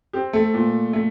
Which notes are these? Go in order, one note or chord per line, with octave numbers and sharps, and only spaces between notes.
C4 G4
A3 A4
A#2
A3